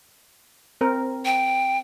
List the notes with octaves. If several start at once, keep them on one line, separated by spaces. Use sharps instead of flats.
C4 A#4
G5